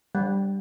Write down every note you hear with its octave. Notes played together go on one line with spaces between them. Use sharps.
G3